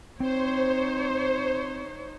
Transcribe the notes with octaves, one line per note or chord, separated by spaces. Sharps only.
C4 D#4 C5 C#5